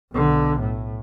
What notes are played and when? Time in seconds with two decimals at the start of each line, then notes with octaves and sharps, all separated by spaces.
0.13 B1 D3
0.60 A2